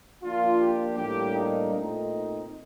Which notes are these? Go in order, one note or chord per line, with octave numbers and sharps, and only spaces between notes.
F3 A#3 D4 F4
G4
A2 G3 A#3 D4 G4
D#4
A#2 A3 C4 D#4